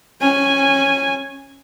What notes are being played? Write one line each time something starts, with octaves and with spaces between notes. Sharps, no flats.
C#4 G#5